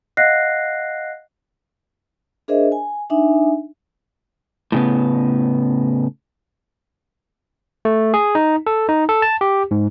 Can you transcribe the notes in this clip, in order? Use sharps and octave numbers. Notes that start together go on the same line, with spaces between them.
D#5 F5 F#5 F#6 A#6 C7
D4 G#4 A#4 C5 D#5 E5
G#5
D4 D#4 E5 G#5
A2 C#3 B3
A3
G#4
D#4
A4
D#4
A4
A5
G4
G#2